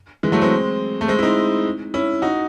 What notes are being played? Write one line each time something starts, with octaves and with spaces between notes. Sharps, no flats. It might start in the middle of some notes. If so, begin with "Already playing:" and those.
E3 G#3
F#3 A3
G#3 C4
A3
G#3 C4
E4
C4 D#4
C#4 E4
D#4 F#4